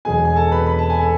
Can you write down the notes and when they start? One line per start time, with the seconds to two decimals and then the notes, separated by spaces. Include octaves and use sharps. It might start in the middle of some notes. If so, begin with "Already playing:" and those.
0.05 E1 E2 B2 G#4 G#5
0.25 G#5
0.36 A4 A5
0.51 B4 B5
0.67 B5
0.79 A5
0.90 G#5
1.01 A4 A5